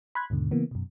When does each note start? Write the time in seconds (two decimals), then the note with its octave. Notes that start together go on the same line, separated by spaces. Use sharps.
0.15 B5 C6 F#6 G#6
0.30 D#2 G#2 B2 D3
0.51 C#3 E3 A#3 B3
0.71 F#2 B2